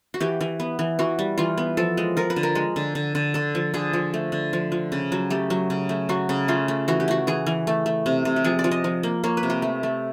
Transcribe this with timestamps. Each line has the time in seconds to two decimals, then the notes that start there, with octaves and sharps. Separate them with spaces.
0.14 F#4
0.20 E3 G4
0.41 E3
0.60 B3
0.79 E3
0.99 E3 F#4
1.19 G3
1.38 E3 F4
1.58 B3
1.77 F3 A4
1.97 G#3
2.17 F3 A#4
2.30 B4
2.36 D3
2.43 A#4
2.55 G#3
2.76 D3
2.95 D3
3.15 D3
3.34 D3 A4
3.55 F3
3.74 D3 G#4
3.93 F3
4.14 A3
4.32 D3
4.53 F3
4.72 F3
4.92 C#3
5.12 F#3
5.30 A3 G4
5.50 F#3
5.70 C#3
5.89 A3
6.09 F#3 F#4
6.29 C#3
6.48 A3 F4
6.68 A3
6.88 E3 F#4
7.00 G4
7.08 A3 F#4
7.27 E3 G#4
7.47 E3
7.67 A3
7.86 A3
8.06 C3
8.25 C3
8.36 G4
8.44 F3 G#4
8.59 D5
8.64 F3
8.72 D#5
8.84 F3
9.03 A#3
9.24 A#3 C#5
9.37 B4
9.43 C3
9.50 G4
9.62 A3
9.83 A3